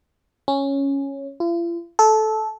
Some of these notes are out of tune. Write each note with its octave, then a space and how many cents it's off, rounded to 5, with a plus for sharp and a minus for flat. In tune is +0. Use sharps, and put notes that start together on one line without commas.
C#4 -5
F4 -45
A4 -15